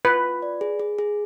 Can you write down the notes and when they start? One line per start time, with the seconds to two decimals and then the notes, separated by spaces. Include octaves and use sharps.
0.05 F4 B4
0.23 F4
0.42 D5
0.61 G#4
0.80 G#4
0.99 G#4